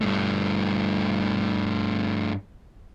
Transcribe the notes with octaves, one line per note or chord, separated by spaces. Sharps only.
G2 A3